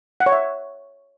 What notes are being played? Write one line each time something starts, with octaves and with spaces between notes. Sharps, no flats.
F#5
C#5
E5